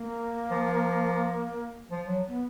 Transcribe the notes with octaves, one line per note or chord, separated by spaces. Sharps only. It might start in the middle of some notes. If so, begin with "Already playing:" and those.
Already playing: A#3
F3
F3
F#3
B3